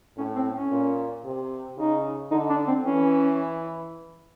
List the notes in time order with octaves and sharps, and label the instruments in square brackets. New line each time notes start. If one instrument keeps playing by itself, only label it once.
[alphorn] A2 [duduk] C#4
[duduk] C4
C#4
[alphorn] A#2
C3
[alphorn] C#3 [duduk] D#4
[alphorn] D3 [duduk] D#4
[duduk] D4
C4
[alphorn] E3 [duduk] C#4